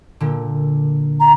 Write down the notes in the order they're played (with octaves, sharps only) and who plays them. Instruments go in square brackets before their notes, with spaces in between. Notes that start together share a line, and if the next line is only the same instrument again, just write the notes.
[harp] A#2 D3
[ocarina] A#5